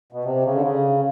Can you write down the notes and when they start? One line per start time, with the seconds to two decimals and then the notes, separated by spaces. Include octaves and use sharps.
0.12 B2
0.25 C3
0.44 C#3
0.54 D3
0.62 C#3